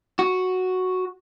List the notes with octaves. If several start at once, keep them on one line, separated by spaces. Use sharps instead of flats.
F#4